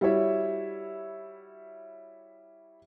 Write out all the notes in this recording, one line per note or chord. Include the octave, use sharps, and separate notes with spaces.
G3 E4 F#4 C#5 E5